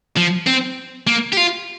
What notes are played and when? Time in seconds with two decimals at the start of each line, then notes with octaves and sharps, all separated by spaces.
0.17 F3
0.47 C4
1.07 A#3
1.33 G4
1.37 F4